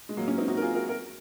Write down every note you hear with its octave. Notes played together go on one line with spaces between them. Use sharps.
G#3
F#3 A#3
A#3 C#4
C4 D#4
D#4 F#4
A#4
F4 G#4
F#4 A#4
F#4 A#4